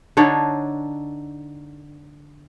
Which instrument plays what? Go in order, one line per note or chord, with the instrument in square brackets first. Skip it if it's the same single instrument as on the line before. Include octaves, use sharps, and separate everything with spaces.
[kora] D3 D4 D#4 C#5